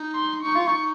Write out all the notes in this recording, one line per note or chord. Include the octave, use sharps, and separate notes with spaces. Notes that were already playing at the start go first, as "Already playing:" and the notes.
Already playing: D#4
C6
D#4 C#6
F4
D#4